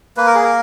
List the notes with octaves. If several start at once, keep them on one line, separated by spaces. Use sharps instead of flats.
A#3 B4
A#4
G#4
A#4